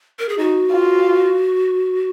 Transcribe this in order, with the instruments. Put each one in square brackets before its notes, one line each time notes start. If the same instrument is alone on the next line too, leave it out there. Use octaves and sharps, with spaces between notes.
[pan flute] A#4
G#4
[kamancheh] D#4 [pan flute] F#4
[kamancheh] F4